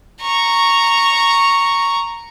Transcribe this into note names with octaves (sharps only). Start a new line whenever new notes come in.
A#5 C#6